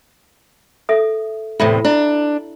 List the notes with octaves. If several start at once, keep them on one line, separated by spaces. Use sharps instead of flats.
A4 E5 D#6
E2 A2 C3 A4 E5 B5
D4 E4